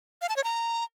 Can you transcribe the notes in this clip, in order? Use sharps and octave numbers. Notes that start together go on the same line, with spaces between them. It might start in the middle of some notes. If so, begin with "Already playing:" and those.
F5
A5
C#5
A#5